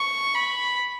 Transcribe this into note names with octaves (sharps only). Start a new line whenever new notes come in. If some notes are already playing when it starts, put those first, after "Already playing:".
Already playing: C#6
B5